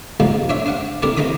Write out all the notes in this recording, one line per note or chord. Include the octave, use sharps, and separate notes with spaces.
D#2 G#2 F3 G3 G#3
D4 C5 C#5 E5
D4 C5 F5 F#5
C3 A3 D4 E4 G4 A#4
E2 D#4 C5 A#5 B5 D#6